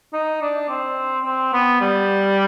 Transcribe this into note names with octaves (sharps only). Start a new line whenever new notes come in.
D#4
D4
C4
C4
B3
G3